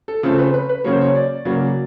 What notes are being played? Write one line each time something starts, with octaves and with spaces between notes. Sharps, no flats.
A4
C#3 F3 A3 C4 A4
B4
B4
B4
C#3 F#3 A#3 C#5
C5
C#5
D5
C#3 F#3 A#3